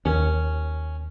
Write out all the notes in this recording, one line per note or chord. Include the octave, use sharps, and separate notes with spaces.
D#2 C#4